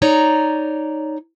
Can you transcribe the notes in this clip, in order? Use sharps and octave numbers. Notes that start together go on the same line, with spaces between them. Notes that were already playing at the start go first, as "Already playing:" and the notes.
D#4 C#5 D5 A#5